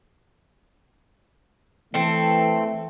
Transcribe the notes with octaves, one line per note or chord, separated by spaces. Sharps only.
E3 A3 C4 A4